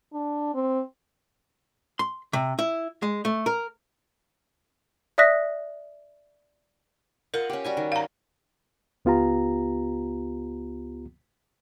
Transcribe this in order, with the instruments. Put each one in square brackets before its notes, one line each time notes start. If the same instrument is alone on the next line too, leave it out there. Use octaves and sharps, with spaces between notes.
[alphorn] D4
C4
[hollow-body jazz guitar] C6
C3
E4
G#3
A3
A#4
[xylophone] D5 E5 D#6 F#6 A#6 B6
[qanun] F4 D#5 F#5 [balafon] A#4
[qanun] C#4 G4
G3 F#4 G#5
D#3
[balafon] F5 A#5
[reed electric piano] C#2 B3 F4 G4 A#5